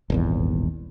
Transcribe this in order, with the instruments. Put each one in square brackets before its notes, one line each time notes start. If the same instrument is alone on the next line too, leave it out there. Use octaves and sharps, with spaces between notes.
[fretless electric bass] D#1 G#1 E2